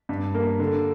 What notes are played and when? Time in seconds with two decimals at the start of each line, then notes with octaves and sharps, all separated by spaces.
0.09 G2
0.35 A#3
0.59 D3